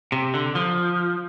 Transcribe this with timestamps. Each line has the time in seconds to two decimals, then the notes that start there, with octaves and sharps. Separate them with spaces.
0.12 C3
0.34 D3
0.55 F3